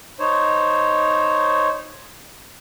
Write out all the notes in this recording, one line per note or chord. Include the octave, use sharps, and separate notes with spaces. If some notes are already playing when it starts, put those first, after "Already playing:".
D#4 C5 C#5